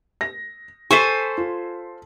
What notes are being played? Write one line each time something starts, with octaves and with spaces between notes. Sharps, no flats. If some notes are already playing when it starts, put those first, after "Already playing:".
A#6
A4 C5 G#5 C#6 B6 C7
F4